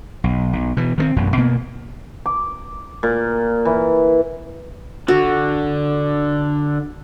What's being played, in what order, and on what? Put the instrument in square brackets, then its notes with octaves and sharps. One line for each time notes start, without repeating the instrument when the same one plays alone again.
[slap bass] B1
B1
B2 E3
D#3 G3 C4
A1 F#2 B2
B2 A#3 B3
[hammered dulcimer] D6
A#2
E3
[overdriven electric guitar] D3 [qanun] F#4